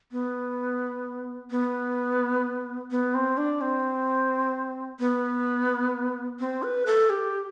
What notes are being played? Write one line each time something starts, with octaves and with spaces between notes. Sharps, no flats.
B3
B3
B3
C4
D4
C4
B3
C4
B4
A4
G4